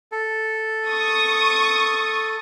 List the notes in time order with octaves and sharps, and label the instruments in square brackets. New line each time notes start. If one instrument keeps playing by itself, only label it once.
[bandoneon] A4
[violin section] C#6 D#6